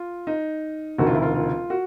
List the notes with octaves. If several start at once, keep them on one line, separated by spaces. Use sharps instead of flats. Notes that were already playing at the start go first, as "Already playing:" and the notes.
Already playing: F4
D#4
E1 D2 C3 D#3 F#4
F4
E4
F4
F4
F#4